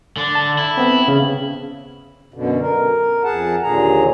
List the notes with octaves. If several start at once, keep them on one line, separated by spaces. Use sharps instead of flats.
D3 D4
A5
E4
B3 C4
C#3
F#2 B2 D3
A#4
F2 G#4 F#5 A5
D#2 A#2 D3 G#4 A#5